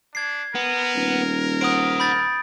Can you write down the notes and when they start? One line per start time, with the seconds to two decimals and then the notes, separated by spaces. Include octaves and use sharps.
0.15 D4 G#6 C7
0.55 B3 A#4
0.95 D#1
1.61 C5 F#5 D#6 D7
2.00 B5 G6 A6